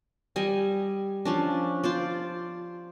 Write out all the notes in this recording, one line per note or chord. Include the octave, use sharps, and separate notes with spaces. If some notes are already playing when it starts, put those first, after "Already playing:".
G3 D#5 G#5
F3 C#4 D4
F4 C5 D5